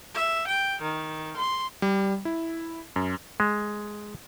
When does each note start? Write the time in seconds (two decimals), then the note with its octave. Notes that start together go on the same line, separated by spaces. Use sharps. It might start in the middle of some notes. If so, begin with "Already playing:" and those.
0.14 E5
0.48 G5
0.82 D#3
1.37 C6
1.82 G3
2.25 E4
2.96 F#2
3.40 G#3